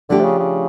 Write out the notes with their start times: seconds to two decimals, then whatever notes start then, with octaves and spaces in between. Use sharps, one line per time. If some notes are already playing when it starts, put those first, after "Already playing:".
0.09 D3 F3 A3 D4 G4
0.20 C3
0.24 C#3
0.39 C#3